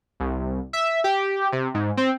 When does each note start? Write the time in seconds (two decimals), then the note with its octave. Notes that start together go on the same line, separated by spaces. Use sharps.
0.20 C2
0.73 E5
1.04 G4
1.52 C3
1.74 G#2
1.97 C4